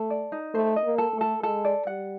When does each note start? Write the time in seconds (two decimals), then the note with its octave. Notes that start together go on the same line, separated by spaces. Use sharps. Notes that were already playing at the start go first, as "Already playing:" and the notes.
Already playing: A3 A4
0.10 D5
0.32 D#4
0.54 A3 C5
0.76 D#5
0.85 A#3
0.98 A4
1.14 A3
1.21 A4
1.42 G#3 A4
1.65 D5
1.87 G3 F#5